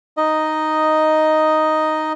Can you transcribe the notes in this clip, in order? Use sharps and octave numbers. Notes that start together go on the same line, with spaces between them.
D#4 D#5